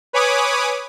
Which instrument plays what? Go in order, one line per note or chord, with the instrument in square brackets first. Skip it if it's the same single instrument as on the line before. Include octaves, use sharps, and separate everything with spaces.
[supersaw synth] B4 C#5 G#5 B5 D6 D#6